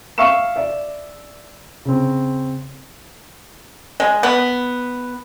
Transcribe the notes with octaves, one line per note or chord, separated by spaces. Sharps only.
E5 F5 C#6 E6 E7
D5 E5
C#3 C4
G#3
B3